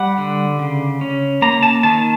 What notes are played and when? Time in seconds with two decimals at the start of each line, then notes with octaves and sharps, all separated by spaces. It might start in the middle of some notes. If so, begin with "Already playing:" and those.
Already playing: G3 F#5
0.18 D3
0.59 C#3
1.01 C#4
1.42 A#3 A#5
1.63 A5
1.83 D#3 A5